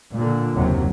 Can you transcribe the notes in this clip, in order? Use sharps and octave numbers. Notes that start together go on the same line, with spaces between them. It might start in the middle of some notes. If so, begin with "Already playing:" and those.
A#2 D3
F#1 D#2 C3 F#3